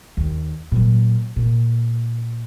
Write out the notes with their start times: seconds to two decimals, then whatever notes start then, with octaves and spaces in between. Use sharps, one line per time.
0.17 D#2 D#3
0.72 A#2 F#3
1.36 A#2